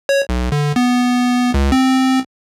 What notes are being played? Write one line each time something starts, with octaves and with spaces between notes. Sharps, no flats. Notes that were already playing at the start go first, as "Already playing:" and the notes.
C#5
B1
D3
B3
C#2
C4